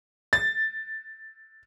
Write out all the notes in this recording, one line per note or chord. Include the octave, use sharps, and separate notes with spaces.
A6